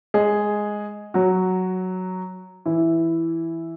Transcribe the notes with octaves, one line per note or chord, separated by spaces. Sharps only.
G#3 G#4
F#3 F#4
E3 E4